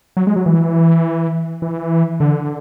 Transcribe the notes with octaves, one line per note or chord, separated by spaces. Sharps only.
F#3
G#3
F#3
E3
E3
D3